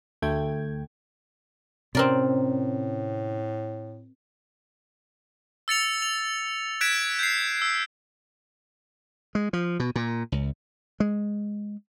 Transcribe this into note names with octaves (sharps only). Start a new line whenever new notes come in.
D2 A3 G5 G#6
A2 C3 C4 C#4 A#4 D5
E6 A6 C#7 F7
F7
F#6 G#6 B6 D7 E7
G6 C7
E6
G#3
F3
B2
A#2
C#2
G#3